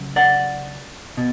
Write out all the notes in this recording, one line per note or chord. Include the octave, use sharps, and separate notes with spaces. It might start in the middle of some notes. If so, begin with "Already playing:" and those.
Already playing: C#3 F#3
D5 F#5
B2